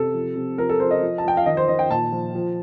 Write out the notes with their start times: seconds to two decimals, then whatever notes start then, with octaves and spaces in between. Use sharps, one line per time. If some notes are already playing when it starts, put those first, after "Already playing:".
Already playing: C3 A4
0.14 F3
0.36 C3
0.58 F3 A#4
0.69 A4
0.80 F3 C5
0.91 D#5
1.02 F3
1.18 A5
1.25 F3 G5
1.37 F5
1.46 D#3 D#5
1.57 C5
1.68 D#3 D#5
1.79 G5
1.90 A#2 A5
2.12 F3
2.35 F3